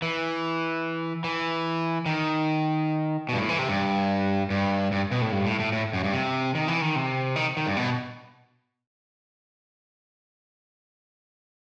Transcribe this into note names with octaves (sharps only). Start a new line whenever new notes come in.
E3
E3
D#3
B2
G2
A2
E3
C3
G2
G2
G2
B2
A2
G2
A2
A2
A2
F#2
G2
C3
D#3
E3
D#3
C3
D#3
D#3
G2
B2